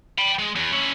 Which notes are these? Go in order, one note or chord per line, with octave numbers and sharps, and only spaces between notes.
G5 B5
G#3
E2
C#4 E4